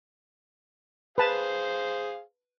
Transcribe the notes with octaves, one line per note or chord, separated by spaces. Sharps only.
G#4 B4 C5 F5 A5